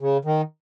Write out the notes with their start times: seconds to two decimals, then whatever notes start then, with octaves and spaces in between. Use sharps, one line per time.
0.01 C#3
0.25 D#3